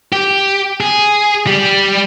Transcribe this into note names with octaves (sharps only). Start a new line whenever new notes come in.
G4
G#4
G3 G4